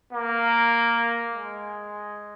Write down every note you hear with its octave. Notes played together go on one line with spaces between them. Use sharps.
A#3
G#3